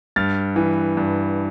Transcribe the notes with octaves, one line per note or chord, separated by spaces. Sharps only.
G2 F6 A6
E3
G2